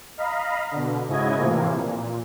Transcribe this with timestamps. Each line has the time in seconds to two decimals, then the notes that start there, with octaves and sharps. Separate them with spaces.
0.17 D#5 F5 A#5 B5
0.71 B2 D3
1.08 G#2 C#3 E4 F#4 D#5 G#6
1.37 A2 C3 E3 F3 A#3
1.76 A#2